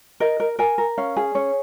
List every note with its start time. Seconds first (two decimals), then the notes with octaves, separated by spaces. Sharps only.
0.20 A#4 D#5
0.40 A#4
0.59 A#4 G#5
0.78 A#4
0.98 C#4 F5
1.17 G#4
1.35 C#4 C#5